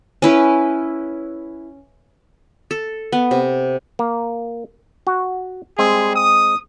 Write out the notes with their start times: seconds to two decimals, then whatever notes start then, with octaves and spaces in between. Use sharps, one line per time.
0.22 C#4 E4 B4
2.71 A4
3.13 B3
3.31 C3
3.99 A#3
5.07 F#4
5.79 G3 G#3 C4 G#4
6.16 D#6